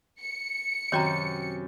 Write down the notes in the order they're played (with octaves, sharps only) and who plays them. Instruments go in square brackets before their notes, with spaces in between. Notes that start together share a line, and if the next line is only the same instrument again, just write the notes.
[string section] C#7
[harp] F#2 C3 [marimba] D#3 F#4 [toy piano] C#5 G5 A#5